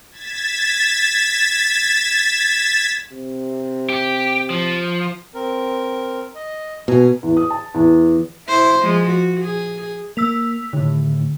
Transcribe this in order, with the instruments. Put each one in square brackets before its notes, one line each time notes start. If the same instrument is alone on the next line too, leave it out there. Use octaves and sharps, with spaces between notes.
[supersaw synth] G#6 A6 B6 E7
[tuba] C3
[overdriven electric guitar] G4
F3
[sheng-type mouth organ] C4 A#4
D#5
[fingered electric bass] B2 [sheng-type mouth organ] G#5 A#5
[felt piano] E2
D#6
A5
E2
[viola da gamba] E4 C5
F3 G#3
F#4
G#4
[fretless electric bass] A#3 [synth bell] E6 B6 F7
[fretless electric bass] A2 D#3 [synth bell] D3